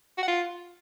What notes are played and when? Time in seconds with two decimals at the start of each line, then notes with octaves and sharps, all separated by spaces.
0.18 F#4
0.23 F#5
0.28 F4